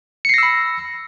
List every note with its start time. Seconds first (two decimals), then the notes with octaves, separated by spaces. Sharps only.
0.25 C#7
0.29 C7
0.34 A#6
0.38 E6
0.43 B5